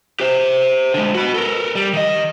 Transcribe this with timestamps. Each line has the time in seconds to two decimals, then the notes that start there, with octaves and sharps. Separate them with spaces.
0.20 G4 C5
0.94 D3 G#3
1.15 F#4 B5
1.34 A4 A#4
1.75 G3
1.93 D#3 D#5